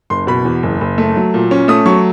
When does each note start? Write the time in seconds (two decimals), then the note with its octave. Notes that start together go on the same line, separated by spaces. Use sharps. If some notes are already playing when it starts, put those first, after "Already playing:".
0.10 F#1 C6
0.27 B2 B5
0.45 E2
0.63 F#1
0.81 F#1
0.98 A3
1.16 F#3
1.34 A#2
1.51 C#4
1.68 A3 D#6
1.86 F#3 C#6